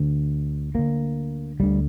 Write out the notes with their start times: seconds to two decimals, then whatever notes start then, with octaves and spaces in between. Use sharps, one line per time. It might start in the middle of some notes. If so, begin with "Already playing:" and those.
Already playing: D2 D3
0.74 D2 D3 A#3
1.60 D2 D3 G3